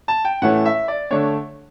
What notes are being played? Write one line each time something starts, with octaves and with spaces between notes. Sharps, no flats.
A5
G5
A2 E3 A3 C#4 F#5
E5
D5
D3 A3 D4 C#5